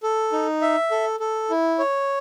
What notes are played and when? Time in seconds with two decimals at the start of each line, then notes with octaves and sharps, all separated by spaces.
0.03 A4
0.32 D#4
0.62 E5
0.91 A4
1.20 A4
1.50 E4
1.79 C#5